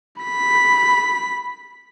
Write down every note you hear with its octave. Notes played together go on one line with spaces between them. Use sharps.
B5 B6